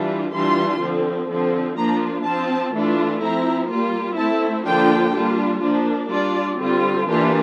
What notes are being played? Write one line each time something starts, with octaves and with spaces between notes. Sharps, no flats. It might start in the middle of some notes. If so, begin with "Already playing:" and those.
Already playing: E3 G3 D4 F4
E3 G3 D4 F4 C6
D3 F3 C4
D3 F3 C4
F3 A#3 D4 F4 A#5
F3 C4 F4 A5
E3 A3 D4 F4
F3 C4 E4 A#5
G3 A#3 F4
A3 C4 E4 A5
D3 F3 A#3 D4 F4 G5
G3 A#3 D4 F4
F3 A#3 D4
G3 D4 F4 D5
D3 G3 C4 F4
E3 A#3 D4 F4 G4